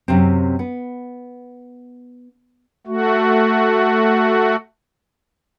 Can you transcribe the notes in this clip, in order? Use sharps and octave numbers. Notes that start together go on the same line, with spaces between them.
F#2 C3 C4
B3
A3 F#4